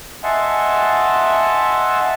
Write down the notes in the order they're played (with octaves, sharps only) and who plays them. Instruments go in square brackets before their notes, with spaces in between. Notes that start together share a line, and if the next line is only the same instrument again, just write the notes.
[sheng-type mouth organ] D#5 E5 F#5 G#5 A5 C6